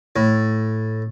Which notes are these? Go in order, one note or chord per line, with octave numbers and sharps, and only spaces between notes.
A2